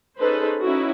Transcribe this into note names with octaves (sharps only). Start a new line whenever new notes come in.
C#4 D#4 G#4 A4 B4 C5
C#4 D#4 E4 F#4